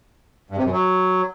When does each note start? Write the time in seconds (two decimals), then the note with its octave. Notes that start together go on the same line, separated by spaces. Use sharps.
0.50 G2
0.58 C3
0.65 F#2
0.72 F#3